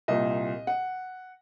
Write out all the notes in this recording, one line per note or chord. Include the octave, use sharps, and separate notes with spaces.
C2 A#2 D#5
F#5